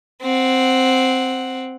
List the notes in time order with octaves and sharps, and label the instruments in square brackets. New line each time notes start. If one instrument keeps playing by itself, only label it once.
[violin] C4 F#5